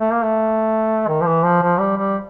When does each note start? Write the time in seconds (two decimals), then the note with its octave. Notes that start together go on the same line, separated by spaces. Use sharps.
0.01 A3
0.12 A#3
0.23 A3
1.08 D#3
1.21 F3
1.26 E3
1.43 F3
1.62 F3
1.79 G3
1.97 G3